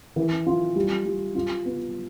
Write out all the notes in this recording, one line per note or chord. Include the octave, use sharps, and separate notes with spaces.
E3
F4
G3
G3
F4
B3